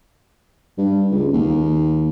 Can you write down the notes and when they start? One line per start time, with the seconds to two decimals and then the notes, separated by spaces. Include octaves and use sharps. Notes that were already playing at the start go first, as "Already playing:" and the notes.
0.78 G2
1.11 C#2
1.33 D#2